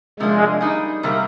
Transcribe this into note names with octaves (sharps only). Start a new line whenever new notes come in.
C3 F3 G#3 A#3 D4
G3 A#3 D#4 G#4
C3 G3 A#3